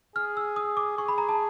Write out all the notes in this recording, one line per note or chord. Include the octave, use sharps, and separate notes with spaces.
G#4 F6
E6
D#6
D6
G#4 C#6
B5
A#5
A5